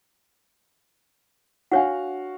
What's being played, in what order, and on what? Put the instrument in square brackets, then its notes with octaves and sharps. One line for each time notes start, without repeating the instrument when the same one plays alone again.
[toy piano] D4 C#5 F#5 [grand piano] F#4 F5